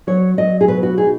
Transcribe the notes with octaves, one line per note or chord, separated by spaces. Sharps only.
F#3 C#5
F#3 D#5
G#4
B2 B4
F#4
D#4 G#4